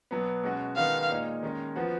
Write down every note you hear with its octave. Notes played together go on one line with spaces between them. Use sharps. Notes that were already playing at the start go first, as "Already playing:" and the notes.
B2 F#3 B3
B2 G#3 C#4 F#4
D#3 G#3 B3 F#4 F5
A#2 G#3 D#4
D#3 G#3 C#4
F3 B3 F#4